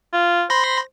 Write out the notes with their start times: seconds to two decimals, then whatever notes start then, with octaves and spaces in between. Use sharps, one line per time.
0.13 F4
0.50 C5 B5 C6 A#6